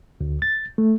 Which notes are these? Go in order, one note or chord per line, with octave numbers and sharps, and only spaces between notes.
D2
A6
A3